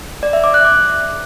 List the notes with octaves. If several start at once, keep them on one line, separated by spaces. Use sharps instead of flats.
D5
E5
D6
F#6
D6